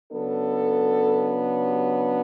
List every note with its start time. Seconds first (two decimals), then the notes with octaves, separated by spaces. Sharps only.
0.11 C#3 F#3 B3 D4 A4
1.63 G4